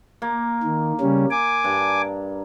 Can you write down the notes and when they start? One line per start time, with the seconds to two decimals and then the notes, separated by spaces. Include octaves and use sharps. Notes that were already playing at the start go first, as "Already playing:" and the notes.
0.22 A#3
0.63 D#3
1.01 C#3 G3 C#4
1.31 G#5 D6
1.64 G2